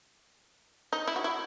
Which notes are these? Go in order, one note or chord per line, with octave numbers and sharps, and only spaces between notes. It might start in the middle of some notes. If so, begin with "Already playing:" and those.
D#4
E4
F#4
E4